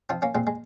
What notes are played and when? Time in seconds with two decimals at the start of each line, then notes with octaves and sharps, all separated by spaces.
0.09 F3 C4 D#4
0.22 A#3 C#4
0.35 A#2 G#3 C4
0.47 G#3